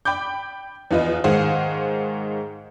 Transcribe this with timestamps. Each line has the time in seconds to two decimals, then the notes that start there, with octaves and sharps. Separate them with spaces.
0.05 G5 B5 D6 G6
0.91 E2 F3 F4 B4 D#5
1.24 G#2 D#3 G#4 C5 F5 F#5